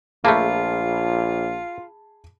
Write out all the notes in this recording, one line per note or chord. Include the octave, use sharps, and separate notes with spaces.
A#1 A3 A#3 F4 G#4 A5 B5